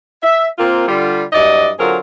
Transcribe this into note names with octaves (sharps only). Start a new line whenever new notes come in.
E5
A#3 C4 F4
D3 G3 F4
G2 F#3 E4 D5 D#5
D3 F#3 C4 F4 G#4 A#4